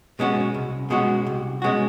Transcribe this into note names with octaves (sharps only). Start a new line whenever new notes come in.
B2 G#3 C#4 F#4
C2
B2 G#3 C#4 F#4
C2
B2 G#3 C#4 F#4